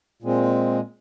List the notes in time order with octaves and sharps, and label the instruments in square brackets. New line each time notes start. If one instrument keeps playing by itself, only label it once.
[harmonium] A#2 G#3 C4